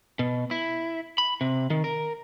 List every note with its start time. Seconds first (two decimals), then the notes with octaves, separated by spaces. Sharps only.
0.19 B2
0.51 E4
1.18 B5
1.41 C3
1.70 D#3
1.84 A#4